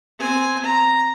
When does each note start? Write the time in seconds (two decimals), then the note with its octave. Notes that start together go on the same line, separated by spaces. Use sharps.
0.19 C4 G#5
0.64 A#5